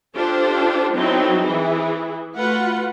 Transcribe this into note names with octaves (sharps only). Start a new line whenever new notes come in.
D4 F4 G4 A4 C5
F#3 B3 C4 D#4 E4 A4
E3 E4 G#4
A3 F4 F#4 B4 F#5